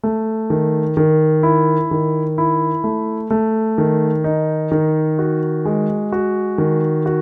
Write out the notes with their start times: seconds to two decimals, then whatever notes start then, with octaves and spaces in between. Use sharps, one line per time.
0.03 A3
0.50 D#3
0.97 D#3
1.43 E4
1.91 D#3
2.38 E4
2.84 A3
3.30 A3
3.78 D#3
4.24 D#4
4.72 D#3
5.19 F#4
5.65 G#3
6.12 F#4
6.58 D#3
7.06 F#4